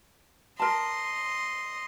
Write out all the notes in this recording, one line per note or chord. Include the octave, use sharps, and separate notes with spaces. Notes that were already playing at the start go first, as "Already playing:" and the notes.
A#4 D#5 A5 C6